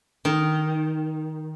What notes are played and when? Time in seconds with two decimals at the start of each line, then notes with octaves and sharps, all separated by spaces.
0.25 D#3